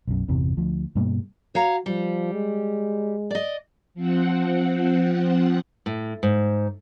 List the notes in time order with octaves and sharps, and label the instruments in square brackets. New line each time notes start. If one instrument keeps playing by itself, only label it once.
[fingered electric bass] B1 F#2
G1 E2 C3 E3
D2 F3
G2 B2 G3 A#3
[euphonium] F#4 [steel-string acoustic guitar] C#5 F5 A#5
[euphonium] F3 [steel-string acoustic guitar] G3
[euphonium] G#3
[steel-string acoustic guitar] D5 D#5
[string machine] F3 C4 F#5
[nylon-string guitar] A2
G#2